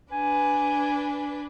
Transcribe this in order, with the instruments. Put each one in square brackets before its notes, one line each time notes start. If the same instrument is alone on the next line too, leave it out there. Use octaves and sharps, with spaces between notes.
[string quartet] D4 B4 [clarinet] G#5